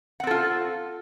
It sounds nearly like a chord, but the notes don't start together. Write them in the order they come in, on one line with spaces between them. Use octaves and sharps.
F#5 C4 A4 F4